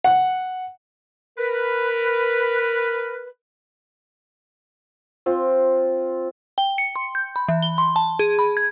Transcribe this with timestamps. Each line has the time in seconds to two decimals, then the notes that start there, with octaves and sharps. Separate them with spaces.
0.04 F#5
1.38 A#4 B4
5.26 C4 F4
6.58 G5
6.78 C#7
6.96 C6
7.15 G6
7.36 B5
7.48 E3
7.63 G7
7.78 C6
7.96 A5
8.19 G#4
8.39 B5
8.57 G#6